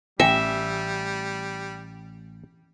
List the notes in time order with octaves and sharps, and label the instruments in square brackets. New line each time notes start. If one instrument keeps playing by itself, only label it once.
[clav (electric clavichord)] A1 [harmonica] G3 [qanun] E5 [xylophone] G5 G#5 A#6